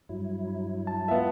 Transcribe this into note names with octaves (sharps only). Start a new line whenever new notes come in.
G2 F#3 E4
A5
B3 F4 E5